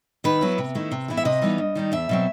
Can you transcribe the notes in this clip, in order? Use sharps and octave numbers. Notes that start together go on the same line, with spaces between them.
D#3 B4
F#3 B3 E4
C3
D#3 A3 E4
C3
E3 B3 E4
E5
C3 D#5
E3 G3 B3 D#4
G2
D#3 G3 D#4
E2 E5
B2 F#3 C4